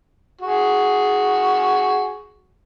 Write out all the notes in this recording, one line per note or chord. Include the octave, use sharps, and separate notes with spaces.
F#4 G#4